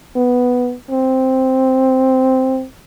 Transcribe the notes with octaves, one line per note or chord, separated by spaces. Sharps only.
B3
C4